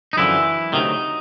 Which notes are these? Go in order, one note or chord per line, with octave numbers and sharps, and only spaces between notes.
D#4
F#2 D3 E3 F3 E4
D2 C3 D#3 F#3 D#4